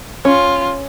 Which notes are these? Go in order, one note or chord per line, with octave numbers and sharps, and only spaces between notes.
C#4 F4